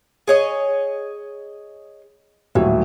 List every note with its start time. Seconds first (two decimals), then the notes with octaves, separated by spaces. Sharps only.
0.27 G#4 C#5 D#5
2.55 D#1 A2 E3 F#3